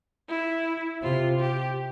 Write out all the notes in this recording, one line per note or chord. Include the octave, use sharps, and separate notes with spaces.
E4
C3 F4
G4